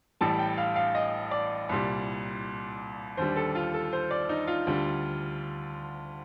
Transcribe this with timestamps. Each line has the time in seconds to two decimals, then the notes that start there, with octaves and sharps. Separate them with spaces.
0.21 A1 A2 G3 A5
0.39 G5
0.58 F5
0.76 F5
0.95 D#5
1.31 D5
1.69 C2 A#2 G3
3.17 D#2 D3 G3 C5
3.36 A4
3.55 F4
3.74 A4
3.93 C5
4.11 D5
4.29 D#4
4.47 F4
4.67 D2 D3 G3